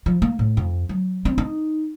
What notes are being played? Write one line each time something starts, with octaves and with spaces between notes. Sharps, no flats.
F3
A#3
A2
F2
F#3
C4
D#4